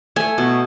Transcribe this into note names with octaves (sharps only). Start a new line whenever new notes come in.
A3 G#5
B2